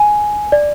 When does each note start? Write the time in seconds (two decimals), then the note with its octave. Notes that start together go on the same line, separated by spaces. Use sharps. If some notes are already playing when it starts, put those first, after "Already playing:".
Already playing: G#5
0.52 D5